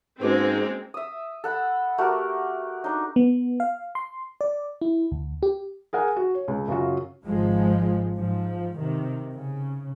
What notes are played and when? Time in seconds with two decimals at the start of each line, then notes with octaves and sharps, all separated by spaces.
0.21 G#2 G#3 A#3 C4 C#4 F#4 B4
0.94 E5 D#6
1.44 A4 F#5 B5
1.98 A3 F#4 G4 A#4
2.84 D4 D#4
3.16 B3
3.60 F5
3.95 C6
4.41 D5
4.81 E4
5.12 D2
5.43 G4
5.93 G#4 A#4 F#5 G#5
6.17 F#4
6.34 C#5
6.48 C#2
6.68 F#2 C#3 F#3 F4 F#4
7.25 G#1 G#2 F3 G#3
8.14 G#2 F3
8.79 C3 D#3
9.34 C#3